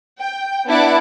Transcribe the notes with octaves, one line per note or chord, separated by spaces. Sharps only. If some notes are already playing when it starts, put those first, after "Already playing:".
G5
B3 D4 E4 D5 F#5 D6